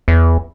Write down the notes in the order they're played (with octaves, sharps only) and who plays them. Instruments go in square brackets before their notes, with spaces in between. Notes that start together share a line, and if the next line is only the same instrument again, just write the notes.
[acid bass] E2